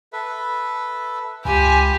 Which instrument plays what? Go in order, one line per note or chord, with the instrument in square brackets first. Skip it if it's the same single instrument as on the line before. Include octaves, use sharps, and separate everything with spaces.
[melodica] A4 B4 E5
[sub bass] C#2 [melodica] F4 B5 [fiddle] G4 [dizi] G#5